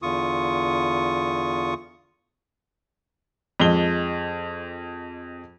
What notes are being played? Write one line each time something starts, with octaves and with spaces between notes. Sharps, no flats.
E2 D3 F4 C#6 D#6
F2 G#3 G7